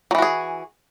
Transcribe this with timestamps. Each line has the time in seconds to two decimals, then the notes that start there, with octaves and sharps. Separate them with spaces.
0.11 F#3
0.15 E3
0.18 F#4
0.22 G#4